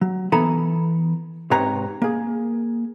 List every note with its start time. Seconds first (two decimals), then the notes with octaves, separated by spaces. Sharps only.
0.01 F#3
0.32 E3 B3 A4 G#5 A#5 B5
1.51 G#2 C3 C4 B4 C#5 A#5
2.02 A#3 G#4